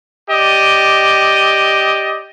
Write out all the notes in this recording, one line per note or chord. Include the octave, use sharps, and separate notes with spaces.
G4 D5 D#5